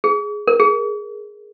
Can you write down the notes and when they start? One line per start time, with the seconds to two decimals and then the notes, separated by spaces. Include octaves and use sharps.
0.04 G#4
0.47 A#4
0.60 G#4